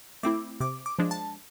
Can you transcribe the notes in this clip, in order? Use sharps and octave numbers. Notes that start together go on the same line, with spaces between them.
A3 C4 E4 D6
C3 D6
D6
F3 G#3 D4
A5